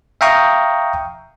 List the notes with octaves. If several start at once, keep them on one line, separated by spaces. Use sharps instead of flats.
E5 F5 G5 A#5 C#6 D#6